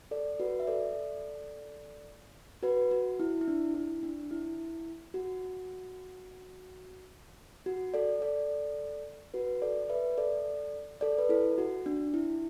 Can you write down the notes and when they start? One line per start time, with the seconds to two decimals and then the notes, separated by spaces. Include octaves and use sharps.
0.11 A4 D5
0.40 F#4 B4
0.60 E5
0.67 A4 D5
2.63 F#4 B4
2.91 F#4
3.20 E4
3.41 E4
3.48 D4
3.74 E4
4.03 D4
4.31 E4
5.14 F#4
7.66 F#4
7.94 A4 D5
8.22 A4 D5
9.34 F#4 B4
9.62 A4 D5
9.90 B4 E5
10.17 A4 D5
11.01 A4 D5
11.18 B4
11.29 E4 A4
11.58 F#4
11.86 D4
12.14 E4